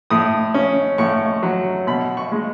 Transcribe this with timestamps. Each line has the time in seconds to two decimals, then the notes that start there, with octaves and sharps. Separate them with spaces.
0.10 A2 D#6
0.54 C#4
0.98 A2 C#6
1.43 F#3
1.87 B2 B5
2.17 C#6
2.32 G#3